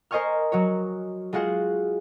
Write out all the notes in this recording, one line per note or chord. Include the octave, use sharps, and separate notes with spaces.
A#4 C5 D#5 G#5 C#6 F6
F#3 F#4 C#5
G#3 F4 F#4 G#4 F#5